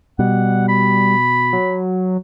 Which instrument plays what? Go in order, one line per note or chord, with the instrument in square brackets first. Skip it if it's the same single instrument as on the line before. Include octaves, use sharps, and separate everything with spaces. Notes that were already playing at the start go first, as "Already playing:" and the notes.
[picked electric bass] B2 [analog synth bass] G3 [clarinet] F#5
[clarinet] B5
[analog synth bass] F#3